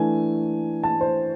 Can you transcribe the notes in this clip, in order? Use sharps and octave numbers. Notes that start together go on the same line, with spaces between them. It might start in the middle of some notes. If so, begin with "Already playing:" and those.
Already playing: E3 A3 D4 G#5
A5
C5